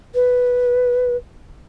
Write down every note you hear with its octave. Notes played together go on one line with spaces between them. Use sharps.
B4